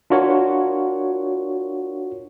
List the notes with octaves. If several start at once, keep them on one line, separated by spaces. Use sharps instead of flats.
D4 F4 F#4 A#4 C#5